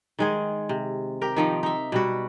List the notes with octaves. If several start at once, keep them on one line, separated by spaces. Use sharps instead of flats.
D#3 G#3 G#4
C3
G4 A#4
D#3 F3 D#4
D#4 E5
B2 G3 F#4